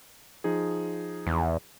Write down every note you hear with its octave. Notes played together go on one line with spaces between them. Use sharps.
F3 D#4 G#4
E2